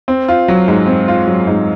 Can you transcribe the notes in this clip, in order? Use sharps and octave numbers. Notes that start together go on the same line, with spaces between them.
C4
F4
F#3
G#2
C4
F4
F#3
G#2